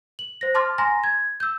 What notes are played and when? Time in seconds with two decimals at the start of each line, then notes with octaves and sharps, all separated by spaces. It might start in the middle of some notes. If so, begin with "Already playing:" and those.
0.19 F#7
0.41 C5 A#6
0.55 A5 C6 D6 F6 A6
0.78 G#5 A#5 C6 A#6
1.04 G#6
1.40 E6 G6